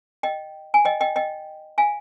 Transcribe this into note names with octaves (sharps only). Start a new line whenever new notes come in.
D#5 G5
G#5
D#5 G5
D#5 G5
D#5 G5
F5 G#5